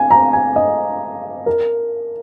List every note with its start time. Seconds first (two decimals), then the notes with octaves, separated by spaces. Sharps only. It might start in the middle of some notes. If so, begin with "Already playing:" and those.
Already playing: G#5
0.11 A#5
0.33 G#5
0.56 D#5
1.46 A#4